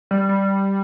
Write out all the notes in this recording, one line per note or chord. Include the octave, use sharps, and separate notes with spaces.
G3
G3